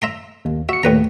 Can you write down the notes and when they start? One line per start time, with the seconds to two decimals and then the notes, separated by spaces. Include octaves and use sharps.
0.02 E5 A#5 C6
0.45 D#2
0.69 F#4 E5 C#7
0.83 D#2 A2 B4 A#5